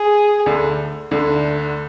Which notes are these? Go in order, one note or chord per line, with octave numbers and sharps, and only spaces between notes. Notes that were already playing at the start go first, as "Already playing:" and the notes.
Already playing: G#4
D2 D3
D2 D3